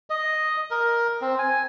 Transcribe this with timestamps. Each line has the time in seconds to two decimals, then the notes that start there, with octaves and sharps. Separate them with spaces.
0.10 D#5
0.71 A#4
1.21 C4
1.39 G#5